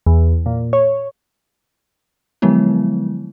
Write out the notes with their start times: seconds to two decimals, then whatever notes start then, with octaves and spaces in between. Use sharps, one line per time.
0.06 E2
0.46 A#2
0.73 C#5
2.42 D3 F3 F#3 G#3 B3 E4